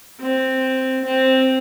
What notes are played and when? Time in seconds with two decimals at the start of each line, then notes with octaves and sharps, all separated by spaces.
0.22 C4
1.06 C4